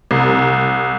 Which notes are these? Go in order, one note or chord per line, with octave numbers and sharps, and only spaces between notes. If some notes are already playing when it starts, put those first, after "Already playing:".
C2